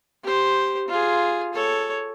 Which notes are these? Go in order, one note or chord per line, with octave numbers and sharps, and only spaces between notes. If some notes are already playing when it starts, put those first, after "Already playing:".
G4 C5
F4 G#4
A4 C#5